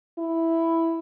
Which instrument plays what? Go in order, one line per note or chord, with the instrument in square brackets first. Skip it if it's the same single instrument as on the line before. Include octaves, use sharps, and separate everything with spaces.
[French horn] E4